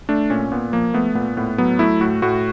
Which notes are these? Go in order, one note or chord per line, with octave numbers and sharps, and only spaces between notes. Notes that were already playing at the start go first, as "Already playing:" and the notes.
A3 D4
A#2 C#4
A#2 B3
F3 A#3
A3 B3
A#2 B3
A2 B3
F#3 B3
A3 E4
A2 F#4
A2 F#4